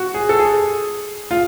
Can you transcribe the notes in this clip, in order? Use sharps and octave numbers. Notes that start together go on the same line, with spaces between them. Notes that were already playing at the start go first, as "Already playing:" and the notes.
Already playing: F#4
G#4
A4
G#4
F4